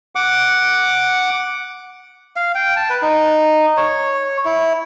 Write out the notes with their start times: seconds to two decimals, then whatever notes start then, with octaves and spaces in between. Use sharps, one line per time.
0.15 F#5 D6
2.36 F5
2.55 G5
2.76 A5
2.90 B4
3.02 D#4
3.77 C#5
4.45 E4